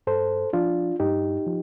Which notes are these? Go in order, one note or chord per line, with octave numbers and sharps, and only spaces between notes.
G2 A4 C5
F3 D4 F4
G2 D#4 G4
F3